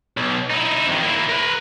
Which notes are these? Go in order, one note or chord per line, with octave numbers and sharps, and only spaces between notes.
B1
D#4 E4
F2 D#3
A#3 E4
A#4 B4